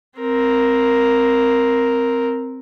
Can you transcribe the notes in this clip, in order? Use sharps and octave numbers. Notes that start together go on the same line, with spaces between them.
C4 A#4